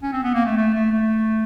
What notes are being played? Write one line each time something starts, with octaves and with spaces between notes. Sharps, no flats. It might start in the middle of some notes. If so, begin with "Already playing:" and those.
C#4
C4
B3
A#3
A3
A3
A3
A3